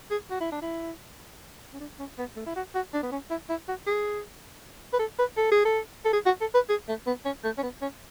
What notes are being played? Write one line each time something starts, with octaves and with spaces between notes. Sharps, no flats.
G#4
F#4
E4
D4
E4
C#4
D4
C#4
B3
A3
E4
F#4
F#4
D4
B3
C#4
E4
E4
F#4
G#4
B4
A4
B4
A4
G#4
A4
A4
G#4
F#4
A4
B4
G#4
A3
B3
C#4
A3
C#4
B3
C#4